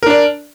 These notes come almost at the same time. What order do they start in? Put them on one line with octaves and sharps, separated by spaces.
A#4 D4 D5